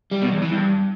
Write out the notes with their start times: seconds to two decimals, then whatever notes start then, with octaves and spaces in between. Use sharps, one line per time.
0.11 G3
0.22 B2
0.32 E2
0.42 E3
0.52 G2